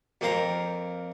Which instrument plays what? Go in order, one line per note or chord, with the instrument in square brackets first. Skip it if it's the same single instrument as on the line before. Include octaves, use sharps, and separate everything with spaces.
[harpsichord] F2 A#3 C4 F5 A#5